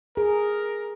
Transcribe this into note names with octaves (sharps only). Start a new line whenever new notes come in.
G#4 A#4